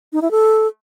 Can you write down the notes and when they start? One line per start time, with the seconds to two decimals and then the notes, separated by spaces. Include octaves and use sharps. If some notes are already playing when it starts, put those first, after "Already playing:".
0.13 D#4
0.22 E4
0.31 A4